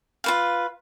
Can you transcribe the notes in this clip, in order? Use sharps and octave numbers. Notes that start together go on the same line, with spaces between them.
F4 B4 F5